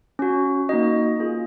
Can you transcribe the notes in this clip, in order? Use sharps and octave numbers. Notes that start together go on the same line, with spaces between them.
C#4 F#4
A#3 D#4 F#4 D#5
A#3 C#4 F4 G#4